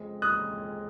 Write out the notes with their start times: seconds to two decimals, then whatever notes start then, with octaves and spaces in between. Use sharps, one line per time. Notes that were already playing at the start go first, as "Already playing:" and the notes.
Already playing: F2 C#3 G#3 C4
0.22 D#6 F#6